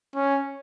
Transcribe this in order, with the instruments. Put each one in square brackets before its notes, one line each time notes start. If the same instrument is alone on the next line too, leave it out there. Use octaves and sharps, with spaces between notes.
[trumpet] C#4